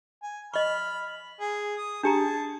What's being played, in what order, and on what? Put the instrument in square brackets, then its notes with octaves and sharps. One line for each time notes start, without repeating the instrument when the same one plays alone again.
[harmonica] G#5
[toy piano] D#5 C#6 [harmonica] B5 F6
[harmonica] G#4
D#6
[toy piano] D4 G4 A#5 [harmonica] G#4 A5